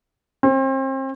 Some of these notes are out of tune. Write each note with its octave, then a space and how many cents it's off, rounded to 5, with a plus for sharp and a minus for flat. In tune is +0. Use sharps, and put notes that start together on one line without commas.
C4 +35